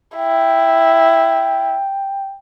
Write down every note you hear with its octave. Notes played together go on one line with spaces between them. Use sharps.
E4 G5